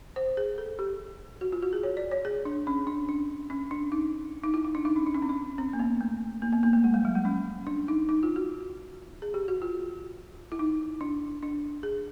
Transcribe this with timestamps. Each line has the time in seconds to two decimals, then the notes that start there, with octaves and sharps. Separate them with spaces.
0.16 C5
0.37 G#4
0.58 A4
0.79 G4
1.41 F#4
1.52 F4
1.63 F#4
1.73 G#4
1.83 C#5
1.97 D5
2.11 C#5
2.25 G#4
2.45 D4
2.67 C#4
2.87 D4
3.09 D4
3.50 C#4
3.71 D4
3.92 D#4
4.44 D#4
4.54 E4
4.65 D#4
4.75 D4
4.85 D#4
4.96 C#4
5.06 D4
5.15 C#4
5.22 C4
5.29 C#4
5.58 C4
5.73 A#3
5.79 B3
6.01 A3
6.42 A#3
6.53 B3
6.63 A#3
6.73 A3
6.84 G#3
6.94 G3
7.05 F#3
7.15 G#3
7.25 C#4
7.67 D4
7.88 D#4
8.09 D#4
8.23 F4
8.36 F#4
9.22 G#4
9.34 G4
9.48 F#4
9.62 F4
10.52 E4
10.59 D#4
11.01 D4
11.43 D4
11.83 G#4